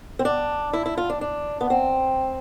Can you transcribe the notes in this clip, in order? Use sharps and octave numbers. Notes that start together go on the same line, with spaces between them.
C4
D4
E4
E4
F4
D4
D4
B3
C4